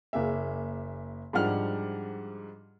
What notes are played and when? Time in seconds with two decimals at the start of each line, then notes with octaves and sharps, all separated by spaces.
0.13 F#1 A#3 G#4 E5
1.33 G#2 F3 G3 D4 F#5 F6